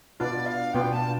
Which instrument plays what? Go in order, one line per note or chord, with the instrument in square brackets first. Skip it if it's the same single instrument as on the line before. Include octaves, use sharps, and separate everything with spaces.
[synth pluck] B2 B3 D4 F4 [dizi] D5
[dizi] F5
[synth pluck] B2 B3 D4 F4 [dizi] G5
[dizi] A5